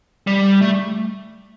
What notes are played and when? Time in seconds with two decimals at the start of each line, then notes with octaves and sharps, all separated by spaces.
0.27 G3
0.62 A3